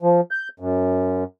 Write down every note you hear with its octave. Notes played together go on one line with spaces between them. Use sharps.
F3
G6
F#2